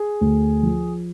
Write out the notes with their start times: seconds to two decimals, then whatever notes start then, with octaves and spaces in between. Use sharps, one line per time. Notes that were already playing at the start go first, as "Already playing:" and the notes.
Already playing: G#4
0.21 D2
0.63 F3